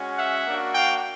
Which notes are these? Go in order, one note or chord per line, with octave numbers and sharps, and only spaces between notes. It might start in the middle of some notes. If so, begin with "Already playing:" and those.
Already playing: G#3 C#4 F#4
E5 F#5
A#3 D4 F#4
F5 G5